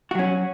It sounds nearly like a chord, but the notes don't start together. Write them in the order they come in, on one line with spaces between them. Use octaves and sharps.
F#4 F#3 C#4